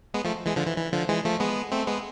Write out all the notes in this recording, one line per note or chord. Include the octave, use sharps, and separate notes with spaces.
G#3 B3
F3 A3
E3 G#3
D3 F3
E3
E3
D3 F3
E3 G#3
F3 A3
G#3 B3
A3 C4
G#3 B3